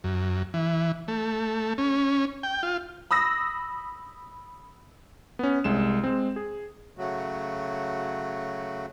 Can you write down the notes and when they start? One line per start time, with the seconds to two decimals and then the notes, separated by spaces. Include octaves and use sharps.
0.04 F#2
0.54 E3
1.08 A3
1.78 C#4
2.43 G5
2.63 F4
3.11 B5 D#6 E6 A#6
5.39 B3 C#4
5.64 C2 G#3 E7
6.04 G#3 C4
6.36 G#4
6.98 C#3 F#3 A3 F#4